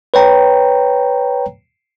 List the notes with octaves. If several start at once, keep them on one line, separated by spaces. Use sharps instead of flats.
B4 C#5 G5 A#5